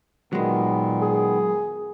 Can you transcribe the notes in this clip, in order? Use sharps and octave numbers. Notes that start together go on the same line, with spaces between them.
A#2 D#3 F#3 G#3 B3
G#4